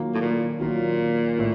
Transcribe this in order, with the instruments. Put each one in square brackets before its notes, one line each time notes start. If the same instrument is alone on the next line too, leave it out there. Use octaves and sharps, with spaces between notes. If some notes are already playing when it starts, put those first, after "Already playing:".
Already playing: [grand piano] D#3 F#3 A#3 F4
[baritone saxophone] A2
A#2
[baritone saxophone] A#2 [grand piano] D#3 F#3 A#3 F4
[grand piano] A2 A3